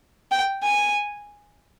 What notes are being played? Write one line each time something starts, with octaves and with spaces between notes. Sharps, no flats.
G5
G#5